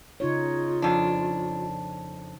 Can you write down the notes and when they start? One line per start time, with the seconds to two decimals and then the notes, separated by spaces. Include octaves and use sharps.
0.20 C#3 D#4 F4 C#5
0.82 F2 D4